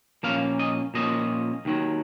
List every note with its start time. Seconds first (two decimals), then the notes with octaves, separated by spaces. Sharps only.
0.23 A#2 F3 A#3 C#4 F5
0.59 D#5
0.94 A#2 F3 A#3 C#4 D#5
1.65 D#2 D#3 F#3